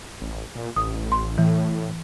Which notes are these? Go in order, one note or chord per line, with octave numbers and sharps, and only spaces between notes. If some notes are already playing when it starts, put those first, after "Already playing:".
A1
A#2
A1 D#6
C6
A2 E3